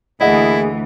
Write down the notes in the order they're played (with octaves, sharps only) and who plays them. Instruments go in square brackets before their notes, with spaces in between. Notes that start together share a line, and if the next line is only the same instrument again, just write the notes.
[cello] D2 E3 [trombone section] A#3 G#4 [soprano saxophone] E4 [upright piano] D#5 F#5